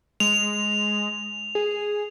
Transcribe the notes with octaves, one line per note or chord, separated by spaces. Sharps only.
G#3 F7
G#4